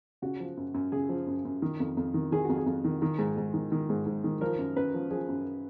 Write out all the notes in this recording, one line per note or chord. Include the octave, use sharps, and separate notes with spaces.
C#3 F#4
F3
F#2
F#2
C#3 G#4
F3
F#2
F#2
D#3
F2
F2
D#3
D#3 G#4
F2 F#4
G#4
F2
D#3
D#3
G#2
G#2
D#3
D#3
G#2
G#2
D#3
F3 A#4
F#2
F#2 B4
F3
F3 G#4
F#2